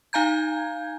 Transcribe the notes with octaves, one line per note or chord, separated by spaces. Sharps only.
D#4 F5 G#5 A#5 G6 G#6